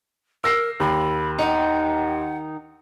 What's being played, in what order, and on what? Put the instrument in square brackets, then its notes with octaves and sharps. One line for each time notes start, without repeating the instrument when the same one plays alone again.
[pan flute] A#4 [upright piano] E6 A#6 C7
[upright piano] D#2 [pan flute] B5
[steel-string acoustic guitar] D#3 D#4 [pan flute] F#5